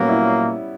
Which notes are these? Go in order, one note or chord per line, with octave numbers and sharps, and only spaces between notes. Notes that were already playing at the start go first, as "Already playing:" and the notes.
Already playing: A#2 F#3 G3 A#3 B3 C#4
E4